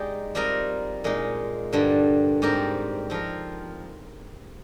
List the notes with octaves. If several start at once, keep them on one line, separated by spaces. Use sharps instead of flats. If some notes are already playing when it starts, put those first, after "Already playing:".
Already playing: G#3 D#4 G4 D5
G3 C4 F4 A#4 D#5
A#2 G#3 D#4
G2 D3 G3
G#2 G3 C4 G4 A#4
F3 C4 F4 A#4